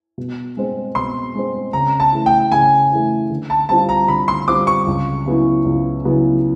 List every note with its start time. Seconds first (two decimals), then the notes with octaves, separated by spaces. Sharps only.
0.18 B2
0.57 G#3 C4
0.95 B2 C6
1.35 G#3 C4
1.73 C#3 A#5
2.00 A5
2.13 E3 A3
2.26 G5
2.52 C#3 G#5
2.92 E3 A3
3.30 D3
3.50 A5
3.69 G3 C4 F4 A5
3.89 A#5
4.08 D3 B5
4.28 C6
4.48 G3 C4 F4 D6
4.67 C#6
4.87 C#2
5.26 C#3 F#3 B3 E4
5.65 C#2
6.04 C#3 F#3 B3 E4